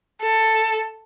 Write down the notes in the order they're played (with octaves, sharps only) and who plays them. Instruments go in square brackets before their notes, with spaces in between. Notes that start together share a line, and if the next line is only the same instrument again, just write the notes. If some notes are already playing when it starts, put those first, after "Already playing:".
[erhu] A4